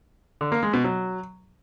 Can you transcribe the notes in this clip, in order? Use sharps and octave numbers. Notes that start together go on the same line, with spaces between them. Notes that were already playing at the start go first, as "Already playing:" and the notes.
D3
A#3
G#3
B2
F#3